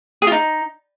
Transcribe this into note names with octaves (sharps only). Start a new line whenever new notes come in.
G#4
F4
D#4